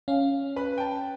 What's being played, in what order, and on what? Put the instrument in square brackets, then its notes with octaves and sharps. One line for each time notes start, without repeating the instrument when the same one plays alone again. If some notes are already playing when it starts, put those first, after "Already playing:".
[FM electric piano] C#4 [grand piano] F5
[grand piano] B4 B5
G5 A5